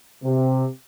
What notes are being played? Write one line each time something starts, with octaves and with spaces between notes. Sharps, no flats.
C3